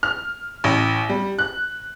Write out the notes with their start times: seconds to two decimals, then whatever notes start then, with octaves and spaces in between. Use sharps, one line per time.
0.03 F6
0.64 A1
1.09 G3
1.39 F#6